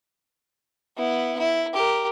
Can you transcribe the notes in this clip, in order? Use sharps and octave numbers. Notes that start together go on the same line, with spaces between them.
B3 E4
E4
G4 A#4